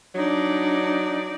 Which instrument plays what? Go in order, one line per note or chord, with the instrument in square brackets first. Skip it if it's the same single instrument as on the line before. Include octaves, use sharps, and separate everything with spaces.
[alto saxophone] F#3 [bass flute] D4 [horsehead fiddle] D#4 D5